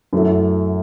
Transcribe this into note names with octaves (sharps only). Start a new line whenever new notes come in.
F#2 F#3 A3 E4 A4